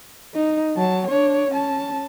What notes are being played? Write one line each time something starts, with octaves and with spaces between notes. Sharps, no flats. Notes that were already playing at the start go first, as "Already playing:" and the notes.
D#4
F#3 A5
D4 C#5
C#4 A5